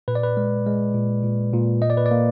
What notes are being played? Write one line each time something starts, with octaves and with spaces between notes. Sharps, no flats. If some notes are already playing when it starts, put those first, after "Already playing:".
A#2 B4
D5
B4
G#3
G#3
A#2
A#2
A#2
A#3 D#5
D5
B4
D5
A#3